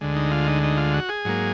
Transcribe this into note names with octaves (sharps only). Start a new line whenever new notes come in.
D2 D3 G#3
D#4
F4
D#4
D#4
F4
F#4
G#4
G#2 F#3 A#3